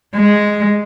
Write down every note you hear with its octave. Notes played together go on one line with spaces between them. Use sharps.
G#3